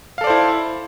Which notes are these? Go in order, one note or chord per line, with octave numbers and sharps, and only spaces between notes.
E4 A4 C5 D5 F5